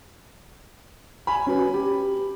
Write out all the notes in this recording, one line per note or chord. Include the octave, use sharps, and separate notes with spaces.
G#5 B5
C#4 F#4 B4
G4